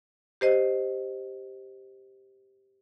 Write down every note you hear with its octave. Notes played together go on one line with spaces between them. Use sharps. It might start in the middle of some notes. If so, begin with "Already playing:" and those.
G4 C5 D#5